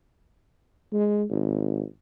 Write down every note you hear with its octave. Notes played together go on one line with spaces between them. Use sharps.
G#3
G#1